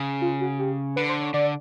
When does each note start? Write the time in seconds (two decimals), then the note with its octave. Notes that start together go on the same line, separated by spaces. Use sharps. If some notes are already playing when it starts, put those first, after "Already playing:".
Already playing: C#3
0.21 F4
0.41 F#4
0.59 G4
0.96 D3 B4
1.09 C5
1.21 C#5
1.34 D3 D5